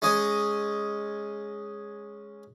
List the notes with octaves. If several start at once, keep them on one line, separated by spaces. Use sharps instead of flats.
G#3 C#4 G#4 D#5